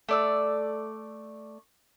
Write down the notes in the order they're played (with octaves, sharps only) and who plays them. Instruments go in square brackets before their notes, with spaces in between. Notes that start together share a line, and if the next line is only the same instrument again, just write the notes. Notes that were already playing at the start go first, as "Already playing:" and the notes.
[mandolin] A3 D5 E6